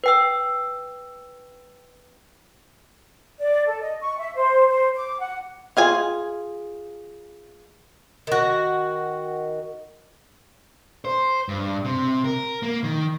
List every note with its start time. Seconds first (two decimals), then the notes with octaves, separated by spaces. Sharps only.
0.04 B4 G5 E6
3.39 D5
3.67 A4
3.81 D#5
4.00 C#6
4.18 E5
4.35 C5
4.68 C5
4.96 D6
5.20 F#5
5.77 F4 G#4 G#5
8.27 D#3 F#4
11.05 C5
11.49 G2
11.84 C3
12.24 A#4
12.63 A#3
12.84 D#3